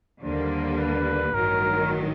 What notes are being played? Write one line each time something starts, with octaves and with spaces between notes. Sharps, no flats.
D#2 D3 G3 A#3 C5
B4
A1 G2 D#3 F#3 A#4